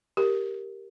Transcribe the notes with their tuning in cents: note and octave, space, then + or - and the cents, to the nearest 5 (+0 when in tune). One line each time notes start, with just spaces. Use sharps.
G4 +0 A#4 +0